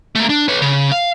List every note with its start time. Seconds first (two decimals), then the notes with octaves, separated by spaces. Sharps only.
0.15 A3 A#3
0.29 D4
0.48 B4 C#5
0.62 C#3
0.92 F5